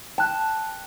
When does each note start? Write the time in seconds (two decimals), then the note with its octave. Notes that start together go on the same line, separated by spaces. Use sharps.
0.18 G5 A5 F#6